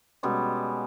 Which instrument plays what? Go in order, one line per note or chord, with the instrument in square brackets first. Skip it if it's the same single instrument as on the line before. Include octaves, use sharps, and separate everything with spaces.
[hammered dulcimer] B2 G3 G#3 C#4